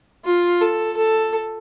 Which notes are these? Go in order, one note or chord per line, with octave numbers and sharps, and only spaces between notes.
F4
A4
A4